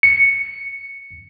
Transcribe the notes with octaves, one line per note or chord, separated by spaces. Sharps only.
C#7